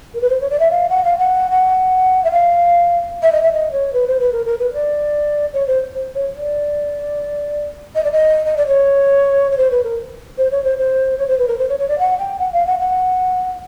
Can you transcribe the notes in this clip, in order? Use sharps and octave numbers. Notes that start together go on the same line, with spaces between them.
A#4
B4
C5
C#5
D5
E5
F5
F#5
F5
F#5
F#5
E5
F5
E5
D#5
E5
D#5
C#5
B4
C5
B4
A#4
A#4
B4
D5
C#5
C5
C5
C#5
D5
D#5
D5
D#5
D#5
D5
C#5
C#5
C5
B4
A#4
C5
C#5
C5
C5
C#5
C5
B4
A#4
C5
C#5
C#5
D5
F#5
G5
F#5
F5
F#5
F#5